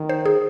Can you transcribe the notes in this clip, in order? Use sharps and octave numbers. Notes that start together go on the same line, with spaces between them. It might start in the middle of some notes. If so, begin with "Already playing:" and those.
Already playing: D#3
C5
G#4